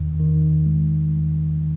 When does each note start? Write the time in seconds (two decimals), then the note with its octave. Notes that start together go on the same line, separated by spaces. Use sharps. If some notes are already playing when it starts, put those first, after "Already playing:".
Already playing: E2 D#3
0.20 D#3
0.66 G#3
1.14 E2